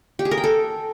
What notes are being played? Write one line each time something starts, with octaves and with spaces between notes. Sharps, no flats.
G4
G#4
A#4
G5
A4